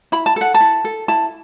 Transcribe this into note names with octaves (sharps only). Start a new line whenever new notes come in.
E4 B5
A5
A4 F#5
A5
E4
A4
E4 A5